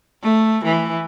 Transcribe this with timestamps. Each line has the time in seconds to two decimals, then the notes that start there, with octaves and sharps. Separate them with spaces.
0.23 A3
0.65 E3